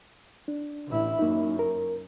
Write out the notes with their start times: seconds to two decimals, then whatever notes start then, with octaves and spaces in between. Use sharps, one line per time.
0.48 D4
0.87 A1 E4
1.19 F#2 A#3 D#4
1.59 A#4